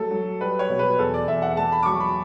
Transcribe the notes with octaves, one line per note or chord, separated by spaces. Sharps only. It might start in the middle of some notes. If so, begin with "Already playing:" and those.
Already playing: F#3 A3 A4
F#3
G3 B4
C#5
B2
B4
E2 A4
D5
E2 E5
F#5
A3 A5
B5
D6
F#3 C#6
B5